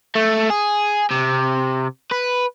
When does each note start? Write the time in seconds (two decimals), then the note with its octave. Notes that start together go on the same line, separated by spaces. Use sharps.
0.16 A3
0.50 G#4
1.11 C3
2.11 B4